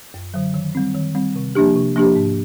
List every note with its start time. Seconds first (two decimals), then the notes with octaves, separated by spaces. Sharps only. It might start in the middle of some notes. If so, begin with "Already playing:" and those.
0.14 F#2
0.34 D3 F#3
0.54 D#3
0.75 G3 C4
0.94 D#3
1.15 G3 C4
1.36 C3
1.55 F3 A#3 D4 G4
1.76 C3
1.96 F3 A#3 D4 G4
2.16 G#2